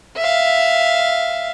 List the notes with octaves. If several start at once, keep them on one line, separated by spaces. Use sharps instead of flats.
E5 F5